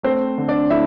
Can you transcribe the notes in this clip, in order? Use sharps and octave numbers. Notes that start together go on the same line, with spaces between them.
A3 C4 C5
D3
D4 D5
A3 E4 E5